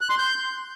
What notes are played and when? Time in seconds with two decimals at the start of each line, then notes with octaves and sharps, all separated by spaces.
0.01 F#6
0.10 C6
0.18 G6